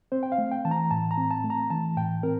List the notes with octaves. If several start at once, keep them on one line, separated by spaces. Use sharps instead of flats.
C4 C5
G5
F5
A3
G5
E3 A5
A#5
A2 A5
A#5
C4
A5
A3
A#5
E3 A5
A2 G5
C4 A#4